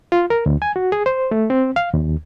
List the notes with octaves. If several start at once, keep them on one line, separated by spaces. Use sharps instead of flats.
F4
A#4
D2
G#5
F#4
G#4
C5
A3
C4
F5
D#2